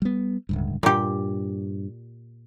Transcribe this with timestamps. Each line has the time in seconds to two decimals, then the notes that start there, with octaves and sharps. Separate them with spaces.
0.02 G3 B3
0.49 D1 C#2 G2
0.83 G2 A#2 G4